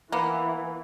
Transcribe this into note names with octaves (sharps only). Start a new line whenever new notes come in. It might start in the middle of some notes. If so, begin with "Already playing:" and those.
E3 A#3 B3